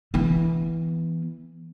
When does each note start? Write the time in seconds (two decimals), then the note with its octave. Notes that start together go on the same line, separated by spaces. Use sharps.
0.14 E3 B3